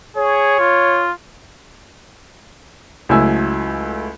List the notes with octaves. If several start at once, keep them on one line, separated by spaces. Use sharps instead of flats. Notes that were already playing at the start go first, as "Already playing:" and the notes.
G#4 C#5
F4
C#2 F#3 A3 E4 G#5 E6